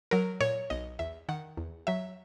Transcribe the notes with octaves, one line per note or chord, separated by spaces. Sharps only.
F#3 A#4
A#2 C#5
B1 D#5
E2 E5
D#3 F#5
E2
F#3 E5